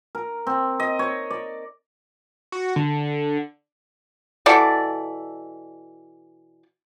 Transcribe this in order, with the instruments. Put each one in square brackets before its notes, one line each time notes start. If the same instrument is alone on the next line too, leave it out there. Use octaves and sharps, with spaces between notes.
[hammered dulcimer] A#4
C4
D#5
C#5
D5
[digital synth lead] F#4
D3
[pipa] B2 E3 A4 D5